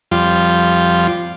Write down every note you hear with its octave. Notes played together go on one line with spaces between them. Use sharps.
F2 G3 F4